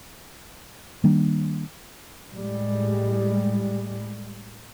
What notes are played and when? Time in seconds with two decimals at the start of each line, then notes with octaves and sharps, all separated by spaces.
1.04 D#3 G3 A#3 D4
2.31 A2 G3 G#3